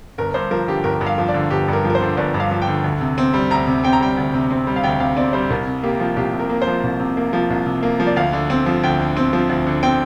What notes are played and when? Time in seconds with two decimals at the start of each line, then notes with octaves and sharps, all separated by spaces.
0.18 G1 A#4
0.34 G2 C5
0.51 F3 A#4
0.67 D3 G4
0.84 G1 A#4
1.01 G2
1.07 F5
1.18 F3
1.28 D5
1.34 D3
1.50 G1 G4
1.68 G2 A#4
1.84 F3
1.90 A#4
1.95 C5
2.01 D3
2.17 G1 D5
2.34 G2
2.40 F5
2.51 F3
2.62 G5
2.67 D3
2.84 D2
3.01 C3
3.18 C4
3.34 G3
3.51 D2 A#5
3.67 C3
3.84 C4 G5
3.93 A#5
4.01 G3 G5
4.17 D2
4.34 C3
4.51 C4
4.67 G3
4.76 F5
4.83 D2 G5
5.00 C3 F5
5.17 C4 D5
5.33 G3 C5
5.50 C2 A#4
5.67 C3
5.83 A#3 G4
6.00 F3
6.16 C2 G4
6.33 C3
6.39 A#4
6.50 A#3
6.62 C5
6.67 F3
6.83 C2
7.00 C3
7.17 A#3
7.33 F3
7.50 C2
7.66 C3
7.83 A#3
8.00 F3
8.07 D5
8.16 D2 F5
8.33 D3
8.50 C4
8.66 F3
8.83 D2 G5
9.00 D3
9.17 C4
9.33 F3
9.49 D2
9.66 D3
9.83 C4 G5